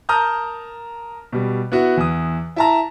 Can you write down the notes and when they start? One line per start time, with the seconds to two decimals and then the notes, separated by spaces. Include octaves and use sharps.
0.09 A#4 A5 A#5 D#6 F6 G6
1.33 B2 G3
1.72 B3 E4 F#4
1.97 E2 D#6
2.56 E4 A5 A#5